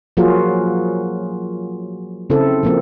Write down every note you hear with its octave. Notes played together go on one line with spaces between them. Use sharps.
F3 F#3 A#3 F4 F#4 G#4
C#3 C4 E4 A4
F3 A#3 C4